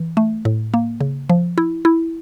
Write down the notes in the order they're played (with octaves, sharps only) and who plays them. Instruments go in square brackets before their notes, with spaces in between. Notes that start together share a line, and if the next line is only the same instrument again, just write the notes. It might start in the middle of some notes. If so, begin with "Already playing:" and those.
Already playing: [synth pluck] E3
A3
A2
A#3
C#3
F3
E4
E4